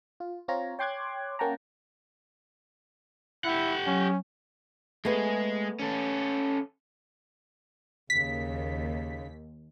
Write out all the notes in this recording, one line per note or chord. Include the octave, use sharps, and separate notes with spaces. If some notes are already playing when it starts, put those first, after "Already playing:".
F4
C4 F4 C#5 A#5
C#5 G5 C6 D6 F#6 G#6
A#3 C#4 F#5 G5 A5 A#5
E4 G4 F#5
F#3 C#4
G#3 A3 B3 G#4
C#4 A4
D#2 C#3 B6